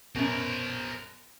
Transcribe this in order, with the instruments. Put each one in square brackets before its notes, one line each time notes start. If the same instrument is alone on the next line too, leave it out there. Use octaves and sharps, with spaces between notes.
[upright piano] F#2 B2 [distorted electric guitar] A#4 C5